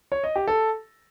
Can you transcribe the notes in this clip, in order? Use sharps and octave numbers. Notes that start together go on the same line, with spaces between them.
C#5
D#5
G4
A4